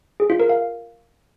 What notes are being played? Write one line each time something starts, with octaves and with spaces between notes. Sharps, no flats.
G#4
F4
A#4
F5